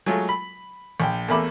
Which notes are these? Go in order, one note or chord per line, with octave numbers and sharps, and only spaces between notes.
F#3 G#3 A3 F4
B5
A#1 G5
E2 A3 A#3 E5 B5 D6